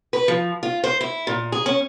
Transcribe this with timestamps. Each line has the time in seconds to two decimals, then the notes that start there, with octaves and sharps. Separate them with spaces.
0.13 B4
0.28 F3
0.63 F4
0.84 C5
1.01 E4
1.27 A#2
1.52 G#4
1.66 C#4